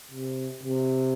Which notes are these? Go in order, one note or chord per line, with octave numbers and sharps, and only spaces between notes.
C3
C3